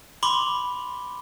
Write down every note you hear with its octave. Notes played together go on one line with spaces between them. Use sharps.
B5 C6 D6 G7